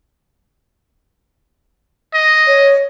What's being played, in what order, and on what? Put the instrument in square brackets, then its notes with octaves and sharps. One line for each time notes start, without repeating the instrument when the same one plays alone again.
[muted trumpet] D#5
[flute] C#5